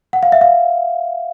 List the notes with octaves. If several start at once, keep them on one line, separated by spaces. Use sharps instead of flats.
F#5
F5
E5
F5